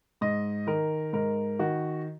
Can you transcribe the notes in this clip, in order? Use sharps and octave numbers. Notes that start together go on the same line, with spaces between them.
G#2 D#5
D#3 A#4
G#2 A#4
D#3 F#4